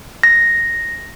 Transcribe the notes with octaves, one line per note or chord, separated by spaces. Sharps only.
A#6